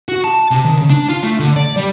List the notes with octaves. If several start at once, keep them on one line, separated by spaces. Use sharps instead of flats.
F#4
A5
C3
D#3
C#3
D4
F4
A3
D3
D5
G3